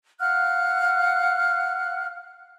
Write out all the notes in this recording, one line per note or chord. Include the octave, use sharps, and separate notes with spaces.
F5 F#5 F6 F#6